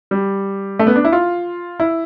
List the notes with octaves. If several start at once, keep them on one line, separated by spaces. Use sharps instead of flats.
G3
A3
B3
D4
E4
F4
E4